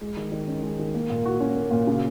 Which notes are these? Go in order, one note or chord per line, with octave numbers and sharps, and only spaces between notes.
G#3
D#3
D#3
C#4
G#3
D#3
A#3
A#2
F#4
C#4
A#3
A#2
C#3